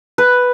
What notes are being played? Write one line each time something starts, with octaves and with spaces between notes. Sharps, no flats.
B4